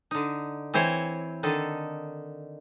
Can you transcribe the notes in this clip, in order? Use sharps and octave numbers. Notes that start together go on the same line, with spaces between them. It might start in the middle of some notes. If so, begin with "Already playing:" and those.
D3 D#4
E3 C4 E4 C5 C#5
D3 D#3 D#4 A4